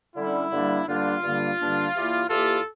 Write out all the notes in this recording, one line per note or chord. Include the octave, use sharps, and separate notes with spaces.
D3 G3 C#4 E4
G2 D3 G3 A#3 D4
G2 D3 G3 A#3 D4 F4
G2 D3 G3 A#3 D4
G2 D3 G3 A#3 D4
E2 E3 A#3 E4 G4
E2 E3 A#3 E4 F4 G4 A4